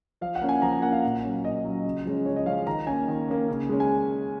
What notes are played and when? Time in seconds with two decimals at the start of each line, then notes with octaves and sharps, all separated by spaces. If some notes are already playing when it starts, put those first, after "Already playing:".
0.21 F3 F5
0.35 F#5
0.41 A#3 C#4
0.49 G#5
0.62 F3 A#5
0.73 G#5
0.82 A#3 C#4 F#5
0.92 F5
1.03 A#2
1.23 F#3 C#4
1.44 A#2 D#5
1.64 F#3 C#4
1.85 C#3
2.05 F3 G#3 C#4
2.26 C#3 C#5
2.36 D#5
2.46 F3 G#3 C#4 F5
2.66 D#3 A#5
2.87 A#3 C#4 G#5
3.08 D#3
3.28 A#3 C#4
3.48 C#3
3.69 G#3 C#4
3.80 G#5